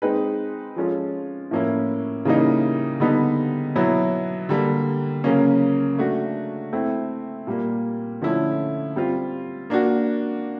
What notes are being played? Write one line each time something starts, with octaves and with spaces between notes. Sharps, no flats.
G#3 C4 D#4 G#4 B4
F3 G#3 C#4 F4 A4
A2 F3 A#3 C#4 E4
C#3 E3 G3 A#3 D#4
D3 G3 B3 D#4
B2 F#3 B3 E4
D3 G3 A#3
C#3 F#3 A#3 C#4
A3 D4 F#4
A3 C4 E4
A#2 G3 A#3
D3 F3 A3 C#4 E4
G3 C4 F4
A#3 D4 F#4